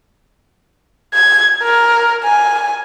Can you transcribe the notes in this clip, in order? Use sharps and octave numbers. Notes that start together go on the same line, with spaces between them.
G#6
A#4
G#5